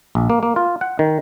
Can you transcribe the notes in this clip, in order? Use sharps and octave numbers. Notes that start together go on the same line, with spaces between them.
A#1
A#3
A#3
F4
F#5
D#3